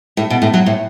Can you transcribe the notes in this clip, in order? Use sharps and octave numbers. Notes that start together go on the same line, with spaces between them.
A2
B2
A2
F#3
A2